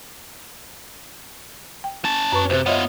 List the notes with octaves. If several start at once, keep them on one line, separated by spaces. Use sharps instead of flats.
G5
C#4 A5
F#2 B4 C#6
C#2 C3 C5
B3 F4 C#5 D#5 E5